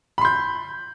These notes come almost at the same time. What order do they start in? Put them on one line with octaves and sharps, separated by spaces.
B5 C6 G6